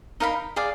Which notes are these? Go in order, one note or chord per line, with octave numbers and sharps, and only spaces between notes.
D#4 A#4 F5 B5
G#4 D5 F5